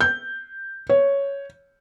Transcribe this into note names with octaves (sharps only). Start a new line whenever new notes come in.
G6
C#5